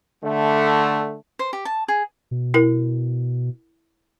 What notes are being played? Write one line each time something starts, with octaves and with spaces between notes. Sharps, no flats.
D3 A3
C5
G4
A5
G#4
B2
E4 A#4